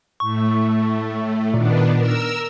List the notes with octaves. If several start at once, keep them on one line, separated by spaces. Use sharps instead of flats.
A2 A3 C#6
A#2 D#3 B3 D4
A#4 E6